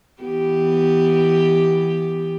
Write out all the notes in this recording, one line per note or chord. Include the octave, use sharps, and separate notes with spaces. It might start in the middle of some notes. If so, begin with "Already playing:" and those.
E3 B3 G4